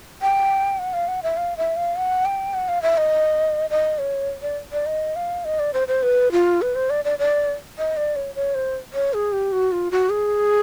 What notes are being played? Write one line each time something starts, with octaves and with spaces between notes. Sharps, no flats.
G5
F#5
F5
F#5
E5
F5
E5
F5
F#5
G5
F#5
F5
E5
D#5
D#5
C#5
D5
D5
D#5
F5
D#5
D5
C5
C5
B4
F4
B4
C5
D5
D5
D5
D#5
D5
C#5
C#5
C5
C#5
G#4
G4
F#4
F4
F#4
G#4